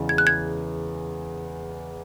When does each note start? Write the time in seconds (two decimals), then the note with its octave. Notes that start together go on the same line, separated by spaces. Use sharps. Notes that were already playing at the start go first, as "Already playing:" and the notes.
Already playing: E2 C#3 G#3
0.09 G#6
0.18 F#6
0.27 G#6